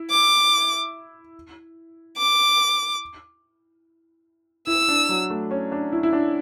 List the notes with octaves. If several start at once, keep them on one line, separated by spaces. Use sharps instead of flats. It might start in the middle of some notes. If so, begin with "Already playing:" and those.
Already playing: E4
D6
D6
E4 E6
D4
F#3
A3
C#4
D4
E4
E4
D4